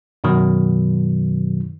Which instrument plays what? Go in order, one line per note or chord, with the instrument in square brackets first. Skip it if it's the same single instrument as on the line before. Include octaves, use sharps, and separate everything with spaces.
[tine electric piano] F#2 B2 D#3 F#3